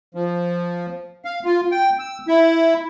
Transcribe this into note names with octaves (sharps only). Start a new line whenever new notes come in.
F3
F5
F4
G5
E6
E4